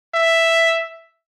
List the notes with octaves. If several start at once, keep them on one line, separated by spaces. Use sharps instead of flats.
E5